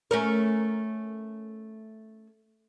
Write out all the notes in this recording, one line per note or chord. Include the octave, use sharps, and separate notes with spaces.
A3 C#4 A#4